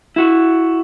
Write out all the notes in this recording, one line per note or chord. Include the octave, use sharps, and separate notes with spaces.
E4 F#4